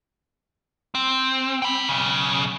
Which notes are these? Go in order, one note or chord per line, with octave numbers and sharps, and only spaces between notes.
C4
G5 B5
B1 C#3